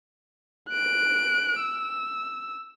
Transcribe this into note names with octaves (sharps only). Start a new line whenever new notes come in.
F#6 D7
E6